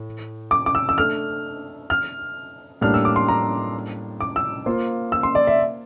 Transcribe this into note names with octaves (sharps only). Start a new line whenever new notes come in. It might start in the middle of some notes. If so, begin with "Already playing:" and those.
Already playing: A2
D6
D6
E6
E6
A3 D4 A4 F6
F6
A2 G3 A#3 D4 F6
E6
D6
C6
A#5
D6
E6
A#3 F4 C5
E6
C6
D5
E5